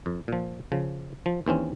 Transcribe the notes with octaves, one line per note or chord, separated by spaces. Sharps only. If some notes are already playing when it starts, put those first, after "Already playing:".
F2
A#2 F3
C#3 F3
F3
D#2 E3 C4 C#4